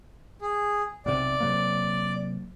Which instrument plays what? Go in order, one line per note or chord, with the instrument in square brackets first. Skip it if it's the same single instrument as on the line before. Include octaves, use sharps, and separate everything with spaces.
[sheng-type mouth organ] G#4
[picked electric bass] B1 C3 [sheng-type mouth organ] D5
[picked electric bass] C3 F#3 A#3